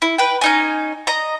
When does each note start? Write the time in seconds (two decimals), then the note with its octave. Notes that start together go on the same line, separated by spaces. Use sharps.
0.02 E4
0.18 B4 G5
0.41 C#4 D#4 G#5
1.07 D#5 A#5